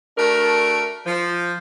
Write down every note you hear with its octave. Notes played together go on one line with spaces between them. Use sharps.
A3 D4 F#4 A#4
F3